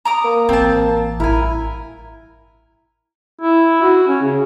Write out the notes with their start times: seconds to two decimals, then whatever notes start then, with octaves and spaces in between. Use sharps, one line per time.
0.05 A#5 D6 D#6
0.24 A#3
0.49 A1 E3 C4 A5
1.20 A1 G2 E4 A#4 G#5
3.41 E4
3.83 F#4
4.08 C#4
4.23 C#3